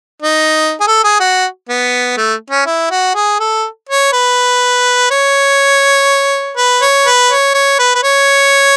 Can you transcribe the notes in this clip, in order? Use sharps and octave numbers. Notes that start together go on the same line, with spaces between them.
D#4
G#4
A4
G#4
F#4
B3
A3
C#4
E4
F#4
G#4
A4
C#5
B4
C#5
B4
C#5
B4
C#5
C#5
B4
B4
C#5